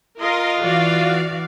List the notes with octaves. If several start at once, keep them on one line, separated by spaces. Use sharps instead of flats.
F4 A#4 D#5 C6
E3 F#4 D5 F5